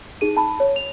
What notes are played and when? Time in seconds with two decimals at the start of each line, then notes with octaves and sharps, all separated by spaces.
0.21 D#4 G#4 D#7
0.37 A5 B5
0.60 C#5
0.76 F7